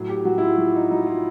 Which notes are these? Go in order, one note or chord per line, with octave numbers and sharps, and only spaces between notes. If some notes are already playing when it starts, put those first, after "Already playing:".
Already playing: A2 F#3
G4
F#3 F#4
E4
F4
F#3
D#4
F#3 D#4
F4